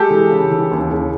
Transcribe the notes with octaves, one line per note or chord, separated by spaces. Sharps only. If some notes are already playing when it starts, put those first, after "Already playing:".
Already playing: G#3 G4 A4
E3
C#3
E3
D#2
C#3